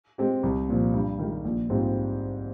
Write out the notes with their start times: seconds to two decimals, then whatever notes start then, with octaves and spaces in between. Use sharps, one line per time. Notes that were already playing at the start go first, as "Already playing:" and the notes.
0.18 G#3 C4 G4
0.43 C2
0.69 A#2 F3
0.94 G2
1.19 D#3 G#3
1.45 A#1
1.70 G#2 G3 C4 F4